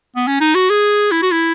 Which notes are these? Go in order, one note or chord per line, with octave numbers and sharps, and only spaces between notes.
B3
C#4
D#4
F#4
G#4
E4
F#4
E4